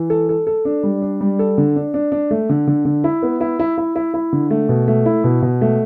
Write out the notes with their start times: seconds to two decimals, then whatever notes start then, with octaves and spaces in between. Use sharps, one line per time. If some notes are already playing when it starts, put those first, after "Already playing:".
Already playing: E3
0.10 A4
0.29 A4
0.47 A4
0.65 D4
0.83 G3
1.02 D4
1.21 G3
1.39 A4
1.58 D3
1.76 D4
1.94 D4
2.12 D4
2.31 A3
2.49 D3
2.67 D3
2.85 D3
3.04 E4
3.22 B3
3.41 E4
3.59 E4
3.78 E4
3.96 E4
4.14 E4
4.33 D3
4.50 A3
4.69 B2
4.88 A3
5.06 E4
5.24 B2
5.42 B2
5.61 A3